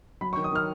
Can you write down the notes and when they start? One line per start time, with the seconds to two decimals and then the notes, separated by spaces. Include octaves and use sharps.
0.21 F#3 B5
0.33 C#6
0.36 D#3
0.44 D#6
0.52 D#3 F6